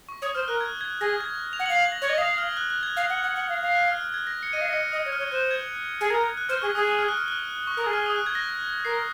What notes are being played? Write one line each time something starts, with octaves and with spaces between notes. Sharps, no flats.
C#6
C#5 D#6
C5 F6
A#4 F#6
G#6
G#6
G#4 A#6
G#6
F7
F#5
F5 F#7
F#7
A#6
C#5 G#6
D#5
F5 D#6
F6
F#6
F#6
G#6
F5
F#5
F#5
F#5
F5
F5
F#6
F6
F6
G#6
A#6
C#7
D#5 D#7
F5
D#5
C#7
D#5 D#6
C#5
F6
C#5
C5 F#6
G#6
G#4
A#4
G#6
F#6
C5 F6
G#4 C#6
G#4 D#6
D#6
F6
F#6
F6
F#6
C#6
A#4 D#6
G#4
F6
D#6
F#6
G#6
A#6
A#4 C7